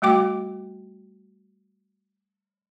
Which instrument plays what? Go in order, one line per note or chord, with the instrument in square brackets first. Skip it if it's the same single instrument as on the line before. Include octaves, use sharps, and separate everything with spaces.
[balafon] G3 A3 F#4 G5 D6